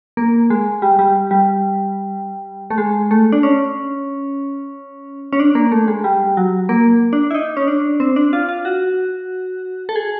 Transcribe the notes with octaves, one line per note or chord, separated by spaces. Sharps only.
A#3
G#3
G3
G3
G3
A3
G#3
A3
D4
C#4
C#4
D4
A#3
A3
G#3
G3
F#3
A#3
D4
E4
D#4
C#4
D4
C4
D4
F4
F4
F#4
A4
G#4